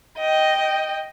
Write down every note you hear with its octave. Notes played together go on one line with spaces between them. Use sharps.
D#5 G5